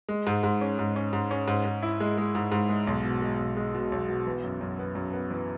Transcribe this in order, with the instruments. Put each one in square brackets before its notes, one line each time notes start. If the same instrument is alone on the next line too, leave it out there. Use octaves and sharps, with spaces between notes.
[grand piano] G#3
G#2
G#2
C#4
G#2
C#4
G#2
C#4
G#2
G#2
E4
G#3
G#3
G#2
G#2
G#3
B1
B2
G#3
B1
G#3
B2
B1
B2
E3
F#2
F#2
B3
F#2
B3
E3